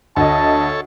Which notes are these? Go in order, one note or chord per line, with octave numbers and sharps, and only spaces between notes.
D2 A4 C#5 D#5 A5